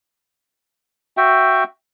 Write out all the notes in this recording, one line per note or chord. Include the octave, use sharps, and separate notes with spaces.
F#4 E5 G5